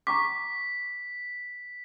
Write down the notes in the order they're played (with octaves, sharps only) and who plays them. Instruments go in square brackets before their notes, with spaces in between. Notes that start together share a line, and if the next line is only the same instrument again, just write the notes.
[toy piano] A#5 C#6 D6 [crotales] B6